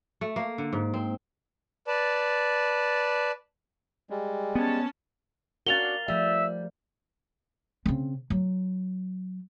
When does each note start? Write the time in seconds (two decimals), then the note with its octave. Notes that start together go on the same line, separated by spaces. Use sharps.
0.21 A3
0.36 A#3
0.58 D3
0.73 G#2
0.94 C4
1.87 B4 D5 A5
4.10 G3 G#3
4.55 B3 C#4 A5
5.67 C#4 D4 F#4 A#4 F5 A6 F7 G7
6.08 F3 G3 A3 E5
7.86 C#3 C4
8.30 F#3